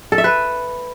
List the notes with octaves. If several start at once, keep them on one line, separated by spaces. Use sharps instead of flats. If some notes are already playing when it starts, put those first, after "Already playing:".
A4
E5
B4